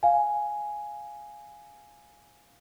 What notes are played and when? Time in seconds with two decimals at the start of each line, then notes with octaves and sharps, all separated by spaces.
0.03 F5 G#5